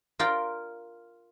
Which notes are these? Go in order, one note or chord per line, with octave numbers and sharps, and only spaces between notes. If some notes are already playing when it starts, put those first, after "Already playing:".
F4 A#4 D5 G5